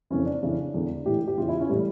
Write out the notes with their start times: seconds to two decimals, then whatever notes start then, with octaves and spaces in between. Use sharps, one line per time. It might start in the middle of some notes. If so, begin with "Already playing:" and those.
0.10 F2 C#3 E3 C#4
0.26 D4
0.42 F2 C#3 E3
0.74 E2 D3
1.06 A2 E3 G4
1.27 G4
1.37 E2 C#3 E3 F4
1.49 E4
1.59 C#4
1.69 A2 E3 G3